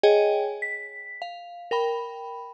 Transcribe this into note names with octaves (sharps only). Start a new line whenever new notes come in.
G#4 C#5 D#5 G5 G#5
B6
F5
A#4 G5 B5